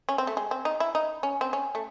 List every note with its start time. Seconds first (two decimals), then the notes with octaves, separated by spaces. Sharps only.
0.09 C#4
0.18 C4
0.27 A3
0.37 G#3
0.51 C4
0.65 D#4
0.80 E4
0.95 D#4
1.23 C#4
1.41 C4
1.53 C#4
1.75 A3